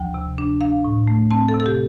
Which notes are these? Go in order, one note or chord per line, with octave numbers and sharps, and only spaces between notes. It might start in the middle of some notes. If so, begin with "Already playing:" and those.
Already playing: D2 F3 G5
C3
D4
D4 F5
A2
A3
C4 A5
A4
C3
A4
G4